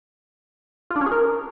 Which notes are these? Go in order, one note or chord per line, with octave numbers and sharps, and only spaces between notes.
F4
D4
C#4
G#4
A#4